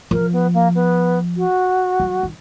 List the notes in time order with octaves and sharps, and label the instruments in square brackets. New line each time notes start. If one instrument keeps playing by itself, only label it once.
[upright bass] F3 [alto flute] A#4
[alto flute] B3
A#3
B3
F#4
[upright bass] F#3
D#3